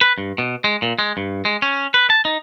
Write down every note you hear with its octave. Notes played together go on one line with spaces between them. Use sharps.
B4
G2
B2
G#3
A#2
G#3
G2
G#3
C#4
B4
A5
D#4